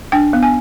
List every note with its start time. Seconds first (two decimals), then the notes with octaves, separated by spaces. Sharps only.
0.12 D4 G5
0.33 B3
0.43 G#5